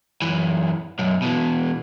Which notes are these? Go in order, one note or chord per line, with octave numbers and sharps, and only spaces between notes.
F#2 E3
B1 F#2
B2 E3